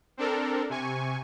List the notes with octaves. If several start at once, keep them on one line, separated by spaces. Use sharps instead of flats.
C4 D4 A4 A#4
C3 G#5 C#6